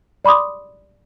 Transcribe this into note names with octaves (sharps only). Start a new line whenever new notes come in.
D5 B5 C6 D6 D#6